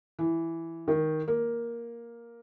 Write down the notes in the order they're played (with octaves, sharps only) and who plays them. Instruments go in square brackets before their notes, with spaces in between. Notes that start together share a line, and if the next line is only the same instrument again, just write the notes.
[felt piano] E3
D#3
A#3